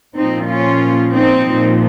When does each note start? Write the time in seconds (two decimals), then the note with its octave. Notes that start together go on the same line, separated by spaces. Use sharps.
0.16 A#2 F3 C4 D#4
0.49 C#4 F4
1.13 C4 D#4
1.46 A#2 F3